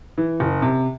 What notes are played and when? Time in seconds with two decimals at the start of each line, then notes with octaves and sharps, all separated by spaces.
0.18 E3
0.40 F#1
0.62 C3